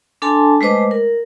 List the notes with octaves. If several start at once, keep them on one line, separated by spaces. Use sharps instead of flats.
D4 A4 G#5 A5 C6
G#3 A3 B4 C5 D#5 D6
A#4